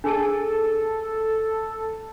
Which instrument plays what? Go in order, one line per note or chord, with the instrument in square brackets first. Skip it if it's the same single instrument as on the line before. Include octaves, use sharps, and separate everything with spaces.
[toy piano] D4 G#4 A5 [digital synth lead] A4